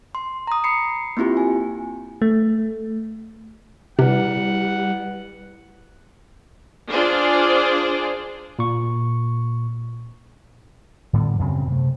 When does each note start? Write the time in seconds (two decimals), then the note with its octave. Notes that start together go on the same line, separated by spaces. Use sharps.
0.15 C6
0.47 A#5 D#6
0.64 B5 C7 C#7
1.17 A#3 C4 E4 F4 G4
1.37 G#5
2.22 A3
3.99 C3 G3 E4 B4 F#5
6.91 D4 F4 G#4 C5 D5
8.59 A#2 C#6
11.13 A2 D3 G3 B3
11.39 F#2 C#3 B3 C4
11.67 C3 A3